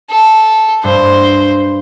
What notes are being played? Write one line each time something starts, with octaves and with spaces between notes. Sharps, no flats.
A4
G2 C5